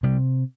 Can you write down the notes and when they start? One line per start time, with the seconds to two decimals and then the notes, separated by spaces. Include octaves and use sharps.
0.03 C3 G3